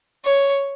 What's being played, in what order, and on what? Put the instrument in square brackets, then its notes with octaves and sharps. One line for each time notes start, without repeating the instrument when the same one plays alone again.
[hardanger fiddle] C#5